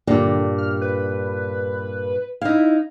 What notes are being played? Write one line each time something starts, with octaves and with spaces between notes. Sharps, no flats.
G2 A#2 D3 G4
F6
B4
D#4 E4 F5